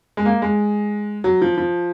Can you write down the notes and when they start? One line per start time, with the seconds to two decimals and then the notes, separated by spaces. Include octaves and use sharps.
0.17 G#3
0.25 A#3
0.42 G#3
1.24 F#3
1.42 F3
1.58 F3